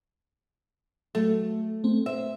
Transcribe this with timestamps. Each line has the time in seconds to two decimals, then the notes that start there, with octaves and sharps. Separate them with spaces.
1.15 F#3 A3
1.84 A3 C4
2.06 C5 E5